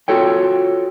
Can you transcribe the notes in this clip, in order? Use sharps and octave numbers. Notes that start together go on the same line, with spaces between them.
F4 F#4 A4 C#5 G5